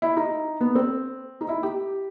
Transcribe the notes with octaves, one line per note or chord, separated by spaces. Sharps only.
E4
D#4
B3
C4
D#4
E4
G4